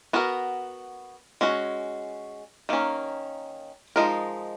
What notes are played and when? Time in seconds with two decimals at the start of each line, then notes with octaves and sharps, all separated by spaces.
0.13 B3 F#4 A#4
1.41 G#3 C#4 F#4
2.69 D#3 A#3 C#4
3.96 F3 G#3 D#4 A#4